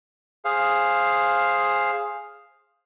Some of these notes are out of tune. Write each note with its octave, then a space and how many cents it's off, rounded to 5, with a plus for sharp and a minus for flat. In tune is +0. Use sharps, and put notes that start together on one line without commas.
G#4 +0 C5 +10 F5 +0